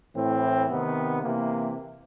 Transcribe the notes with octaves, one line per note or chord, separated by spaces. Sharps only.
A2 E3 C4
C3 D#3 B3
C3 E3 A#3